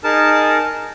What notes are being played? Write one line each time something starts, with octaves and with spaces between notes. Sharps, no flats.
D#4 G#4 A#4 A5